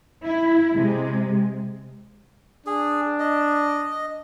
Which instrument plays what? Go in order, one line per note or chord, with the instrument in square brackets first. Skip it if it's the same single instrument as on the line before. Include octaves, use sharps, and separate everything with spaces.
[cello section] E4
C3 G#3
[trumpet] D4 [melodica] G#4
[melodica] D#5